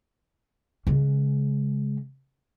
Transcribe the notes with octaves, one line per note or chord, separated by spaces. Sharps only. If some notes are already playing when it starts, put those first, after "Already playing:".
C#3 G#3